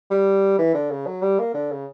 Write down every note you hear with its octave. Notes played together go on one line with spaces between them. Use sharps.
G3
E3
D3
C#3
F#3
G3
A#3
D3
C#3